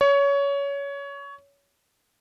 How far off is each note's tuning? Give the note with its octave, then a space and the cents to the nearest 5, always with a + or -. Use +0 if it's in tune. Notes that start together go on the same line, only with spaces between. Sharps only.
C#5 +20